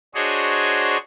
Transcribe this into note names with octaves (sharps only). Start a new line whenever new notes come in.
D4 F#4 G#4 C5 C#5 D#5